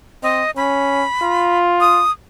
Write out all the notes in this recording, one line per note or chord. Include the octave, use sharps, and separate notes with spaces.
C4 D#5
C#4 B5
F4
D#6